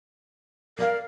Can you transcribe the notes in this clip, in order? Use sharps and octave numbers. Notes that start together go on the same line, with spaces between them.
A#4 D5 D#5 F5